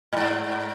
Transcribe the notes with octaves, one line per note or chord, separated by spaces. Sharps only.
A2
G#2